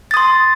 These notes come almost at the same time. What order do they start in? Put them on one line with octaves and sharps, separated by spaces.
A6 D#6 C6